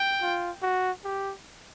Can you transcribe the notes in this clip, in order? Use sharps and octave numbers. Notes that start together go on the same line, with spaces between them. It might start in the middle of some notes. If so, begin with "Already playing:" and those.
Already playing: G5
F4
F#4
G4